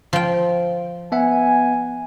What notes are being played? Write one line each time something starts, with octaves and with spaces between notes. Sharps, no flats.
F3 G5
B3 E5 F#5 G#5